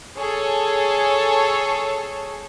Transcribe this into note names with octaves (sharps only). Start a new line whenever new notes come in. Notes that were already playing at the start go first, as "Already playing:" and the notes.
G#4 A4 C#5